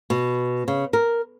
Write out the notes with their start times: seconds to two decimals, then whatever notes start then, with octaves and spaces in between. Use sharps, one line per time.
0.10 B2
0.68 C#3
0.93 A#4